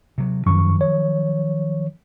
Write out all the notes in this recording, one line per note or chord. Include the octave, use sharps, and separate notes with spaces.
C3 F#3
F#2 D#3 F3 F#3 C#6
C#5